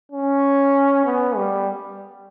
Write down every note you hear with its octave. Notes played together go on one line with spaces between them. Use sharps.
C#4
B3
G3